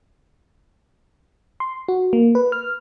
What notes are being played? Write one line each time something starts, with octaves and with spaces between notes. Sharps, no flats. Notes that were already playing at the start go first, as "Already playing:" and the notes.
C6
F#4
A#3
B4
F6